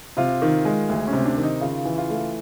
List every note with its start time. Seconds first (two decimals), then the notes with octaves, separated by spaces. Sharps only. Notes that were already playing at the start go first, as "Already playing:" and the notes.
0.17 C3 F4
0.42 D#3
0.65 G#3
0.89 D2
1.07 C#4
1.13 C3
1.25 D4
1.38 D#3
1.43 D#4
1.61 C#3 F4
1.85 E3
1.98 F4
2.10 A3